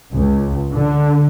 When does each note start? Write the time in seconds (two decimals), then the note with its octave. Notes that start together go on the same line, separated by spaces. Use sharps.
0.14 C#2
0.74 D3